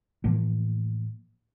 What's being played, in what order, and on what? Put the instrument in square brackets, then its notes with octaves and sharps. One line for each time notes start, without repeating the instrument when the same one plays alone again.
[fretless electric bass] A2 E3 F3 A#3